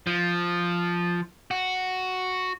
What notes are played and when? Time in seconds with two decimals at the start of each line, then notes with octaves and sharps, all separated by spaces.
0.07 F3
1.51 F#4